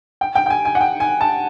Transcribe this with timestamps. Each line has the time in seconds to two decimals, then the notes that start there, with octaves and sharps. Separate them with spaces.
0.21 G5
0.35 G5
0.46 G5
0.50 G#5
0.65 G#5
0.75 F#5
0.81 G5
1.00 G#5
1.21 A5